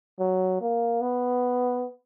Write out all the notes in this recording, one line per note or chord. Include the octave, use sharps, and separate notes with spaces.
F#3
A#3
B3